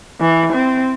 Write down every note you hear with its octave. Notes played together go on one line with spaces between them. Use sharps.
E3
C4